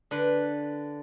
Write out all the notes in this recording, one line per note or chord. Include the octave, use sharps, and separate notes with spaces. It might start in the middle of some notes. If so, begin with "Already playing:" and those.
D3 B4